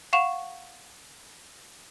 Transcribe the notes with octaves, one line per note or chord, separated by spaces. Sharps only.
F5 F#5 C#6 E7 F7